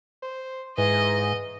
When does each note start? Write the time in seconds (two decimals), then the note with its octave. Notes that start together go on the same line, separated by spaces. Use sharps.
0.23 C5
0.78 G#2 E3 G#4 D#5